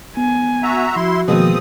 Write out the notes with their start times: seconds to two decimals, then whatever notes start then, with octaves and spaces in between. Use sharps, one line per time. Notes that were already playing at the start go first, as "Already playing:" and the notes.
0.17 B3 G#5
0.63 F#4 E5 A#5
0.96 F3 E4 F#4 C6
1.28 B2 D#3 F3 G#3 A#3 C4 D#6